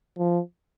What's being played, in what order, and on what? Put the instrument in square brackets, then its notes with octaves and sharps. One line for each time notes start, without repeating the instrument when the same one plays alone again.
[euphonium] F3